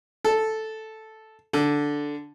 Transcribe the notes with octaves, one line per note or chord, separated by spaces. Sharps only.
A4
D3